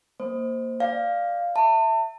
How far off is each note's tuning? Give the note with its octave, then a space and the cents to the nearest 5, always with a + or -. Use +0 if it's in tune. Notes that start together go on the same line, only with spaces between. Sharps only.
A#3 -5 C5 +0
D5 +10 F5 +0
E5 +0 A5 +35